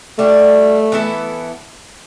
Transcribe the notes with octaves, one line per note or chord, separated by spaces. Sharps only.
G3 A3 D4 F#4
E3 B3 E4 A4